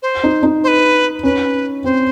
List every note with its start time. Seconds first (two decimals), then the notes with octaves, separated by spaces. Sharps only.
0.02 C5
0.24 D#4
0.43 D#4
0.64 C5
0.68 B4
1.23 C#4 B4
1.84 C4 C5